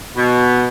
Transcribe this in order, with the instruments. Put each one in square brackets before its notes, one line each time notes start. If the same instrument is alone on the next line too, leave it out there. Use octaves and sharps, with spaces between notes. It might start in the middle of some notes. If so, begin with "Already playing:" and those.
[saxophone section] B2